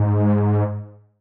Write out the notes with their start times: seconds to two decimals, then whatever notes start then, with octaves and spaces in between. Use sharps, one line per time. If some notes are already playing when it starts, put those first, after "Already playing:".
Already playing: G#2